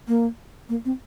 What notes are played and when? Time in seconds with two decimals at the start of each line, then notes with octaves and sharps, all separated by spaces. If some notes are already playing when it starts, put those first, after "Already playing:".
0.08 A#3
0.69 A#3
0.85 C4